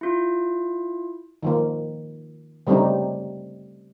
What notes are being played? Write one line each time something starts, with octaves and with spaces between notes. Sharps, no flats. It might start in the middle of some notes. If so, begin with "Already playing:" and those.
E4 F4
D#3 F3 A#3
C#3 G3 A3 C4 D#4